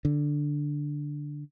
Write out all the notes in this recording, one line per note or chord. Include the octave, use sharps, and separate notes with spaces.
D3